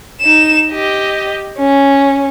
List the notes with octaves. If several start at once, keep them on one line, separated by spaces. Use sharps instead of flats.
D#4 E7
G4 D#5
C#4